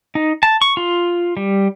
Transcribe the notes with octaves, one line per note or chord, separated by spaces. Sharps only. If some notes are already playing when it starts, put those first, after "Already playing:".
D#4
A5
C#6
F4
G3